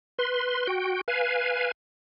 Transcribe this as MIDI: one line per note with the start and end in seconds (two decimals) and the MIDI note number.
0.18 0.67 71
0.18 0.67 84
0.67 1.01 66
0.67 1.01 79
1.08 1.71 71
1.08 1.71 77
1.08 1.71 80